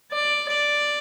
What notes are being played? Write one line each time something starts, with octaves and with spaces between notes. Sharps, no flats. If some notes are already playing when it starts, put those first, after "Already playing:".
D5
D5